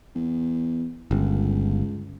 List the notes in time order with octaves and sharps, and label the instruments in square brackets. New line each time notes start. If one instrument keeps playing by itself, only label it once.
[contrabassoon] E2
[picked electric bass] G1 [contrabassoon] C#2